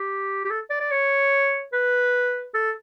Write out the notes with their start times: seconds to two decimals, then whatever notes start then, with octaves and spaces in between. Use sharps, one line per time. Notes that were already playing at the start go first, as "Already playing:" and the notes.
Already playing: G4
0.45 G4
0.50 A4
0.70 D5
0.80 D5
0.91 C#5
1.73 B4
2.54 A4